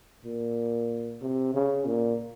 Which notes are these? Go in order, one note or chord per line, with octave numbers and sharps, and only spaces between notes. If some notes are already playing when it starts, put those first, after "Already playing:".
A#2
C3
C#3
A#2